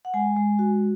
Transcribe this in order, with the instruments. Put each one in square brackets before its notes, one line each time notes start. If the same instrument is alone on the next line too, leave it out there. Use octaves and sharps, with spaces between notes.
[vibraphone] F#5
G#3 G#5
G#3
F#4